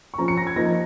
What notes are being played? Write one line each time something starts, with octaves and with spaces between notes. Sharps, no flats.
C#6
F3 C#4 A#5
C#7
A#6
G#6
F3 A#3 D#4 A#6